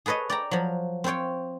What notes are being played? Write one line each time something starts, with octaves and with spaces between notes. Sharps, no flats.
G#4 A4 B4 C#5 D#5
D5 G5 A#5
F3 F#3
C4 F4 C5 C#5 G5